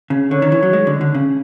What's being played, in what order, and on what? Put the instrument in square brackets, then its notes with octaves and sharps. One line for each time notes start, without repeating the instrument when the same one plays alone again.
[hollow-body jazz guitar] C#3
[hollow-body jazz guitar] D3 [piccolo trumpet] C#5
[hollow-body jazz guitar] D#3
E3
F#3
G#3
D3
D3
C#3